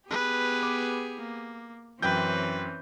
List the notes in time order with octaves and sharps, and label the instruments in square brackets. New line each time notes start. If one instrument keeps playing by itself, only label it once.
[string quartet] B3 G4 G#4 [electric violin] B4
[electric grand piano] D6
[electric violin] A#3
[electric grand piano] F#2 G5 G6 [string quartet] E3 C4 C#4 [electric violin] B4